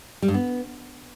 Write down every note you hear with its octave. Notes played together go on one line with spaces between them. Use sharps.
G3
G2
B3